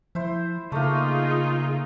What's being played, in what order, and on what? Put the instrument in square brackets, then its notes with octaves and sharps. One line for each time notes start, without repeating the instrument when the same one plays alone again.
[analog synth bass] F3 [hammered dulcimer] E4 C5
[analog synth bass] C#3 [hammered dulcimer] A3 A#3 [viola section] D#4 F4 G#4